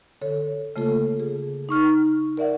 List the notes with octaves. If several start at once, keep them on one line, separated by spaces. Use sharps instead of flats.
D3 A4 C#5
C#3 A3 A#3 F4 A4
G#4
D#4 C#6 F6
A#4 D5 E5 F#5